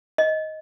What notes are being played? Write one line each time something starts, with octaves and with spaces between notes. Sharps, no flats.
D#5